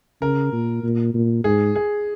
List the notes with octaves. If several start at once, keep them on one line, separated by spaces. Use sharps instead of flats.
C#3 A#4
A#2
A#2
A#2
G#2 G#4
G#4